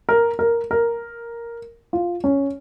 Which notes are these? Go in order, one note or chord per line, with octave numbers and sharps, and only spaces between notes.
A#4
A#4
A#4
F4
C#4